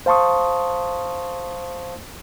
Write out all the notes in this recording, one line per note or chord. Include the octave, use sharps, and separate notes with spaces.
C5 F5 A5 C6 C#6 D#6